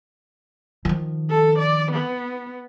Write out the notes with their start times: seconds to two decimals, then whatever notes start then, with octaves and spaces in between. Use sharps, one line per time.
0.85 D#3 F3
1.30 A4
1.59 D5
1.91 B3